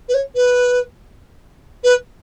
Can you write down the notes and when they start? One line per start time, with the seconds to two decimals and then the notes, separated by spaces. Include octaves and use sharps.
0.09 B4
0.14 C#5
0.35 B4
1.84 B4